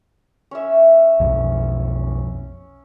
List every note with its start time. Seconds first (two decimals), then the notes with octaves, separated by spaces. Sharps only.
0.51 C#4 E5
1.20 B1 F2